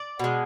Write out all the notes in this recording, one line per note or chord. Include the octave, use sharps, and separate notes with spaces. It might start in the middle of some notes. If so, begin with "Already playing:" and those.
Already playing: D5
B2 G#3